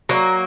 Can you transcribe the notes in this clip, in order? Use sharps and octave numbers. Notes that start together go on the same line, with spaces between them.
F#3 A#3